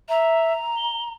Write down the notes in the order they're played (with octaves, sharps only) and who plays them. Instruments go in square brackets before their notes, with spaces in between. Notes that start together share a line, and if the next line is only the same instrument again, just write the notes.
[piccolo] E5 [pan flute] A#5
[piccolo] G7